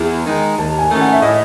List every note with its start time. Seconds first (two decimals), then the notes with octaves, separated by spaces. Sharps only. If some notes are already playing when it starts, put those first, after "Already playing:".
Already playing: E2
0.25 D#3 G#3 D#4
0.58 D#2 A5
0.79 G#5
0.90 D#3 A3 C#4 E4
1.01 F#5
1.13 E5
1.22 A2 D#5